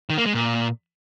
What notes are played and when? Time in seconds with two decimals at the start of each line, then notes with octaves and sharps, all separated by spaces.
0.10 D#3
0.18 A#3
0.26 G#3
0.34 A#2